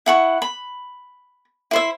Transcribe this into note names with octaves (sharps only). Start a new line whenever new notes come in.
E4 F#5 C#6
B5
E4 C5 E5